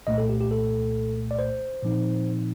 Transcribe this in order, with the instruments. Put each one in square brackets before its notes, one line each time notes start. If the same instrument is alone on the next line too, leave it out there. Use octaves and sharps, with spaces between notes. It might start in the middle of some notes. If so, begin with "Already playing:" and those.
[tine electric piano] C2 A#2 A3 D#5
A4
G4
G4
A4
D5
C5
A#2 F3 C4 D#4